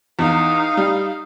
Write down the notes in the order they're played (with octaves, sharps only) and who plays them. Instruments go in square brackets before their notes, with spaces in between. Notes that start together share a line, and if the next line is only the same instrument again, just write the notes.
[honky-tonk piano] E2 [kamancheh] D#4 F5
[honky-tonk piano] G3